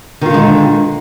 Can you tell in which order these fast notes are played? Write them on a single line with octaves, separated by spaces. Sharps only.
D#3 F4 D3 G#3